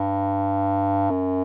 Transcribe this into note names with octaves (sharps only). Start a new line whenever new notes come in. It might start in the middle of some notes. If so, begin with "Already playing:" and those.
Already playing: G2
F#2